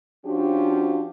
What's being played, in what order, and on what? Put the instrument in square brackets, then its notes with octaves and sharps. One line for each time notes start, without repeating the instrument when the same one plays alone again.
[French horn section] F3 C#4 D4 F#4 G4